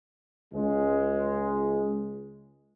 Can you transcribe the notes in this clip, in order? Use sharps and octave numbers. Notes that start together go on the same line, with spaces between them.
C#2 G#3